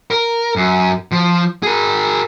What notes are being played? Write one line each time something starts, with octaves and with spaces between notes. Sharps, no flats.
A#4
F#2
F3
G#4 A#4